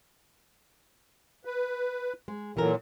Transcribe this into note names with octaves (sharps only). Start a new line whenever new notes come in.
B4
G#3
A#2 E3 F#3 A4 A#4